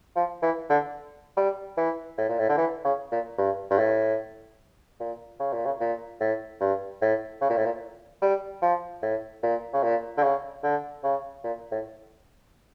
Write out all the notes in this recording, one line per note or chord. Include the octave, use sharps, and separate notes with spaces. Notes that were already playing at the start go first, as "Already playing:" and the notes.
F3
E3
D3
G3
E3
A2
A#2
A2
D3
E3
C#3
A#2
G2
G2
A2
A#2
C#3
A#2
C#3
A#2
A2
G2
A2
C#3
A#2
A2
A#2
G3
F3
A2
A#2
C#3
A#2
D3
C#3
D3
C#3
A#2
A2